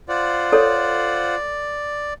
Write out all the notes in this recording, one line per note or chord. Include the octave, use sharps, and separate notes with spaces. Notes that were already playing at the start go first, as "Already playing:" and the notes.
F4 C5 D5 F#5
A4 C#5